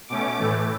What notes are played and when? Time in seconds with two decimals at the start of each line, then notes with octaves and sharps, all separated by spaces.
0.09 B2 A3 C#4 D6
0.39 A2 E3 A3